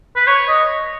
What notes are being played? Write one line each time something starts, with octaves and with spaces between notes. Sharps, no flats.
B4
C#5
D#5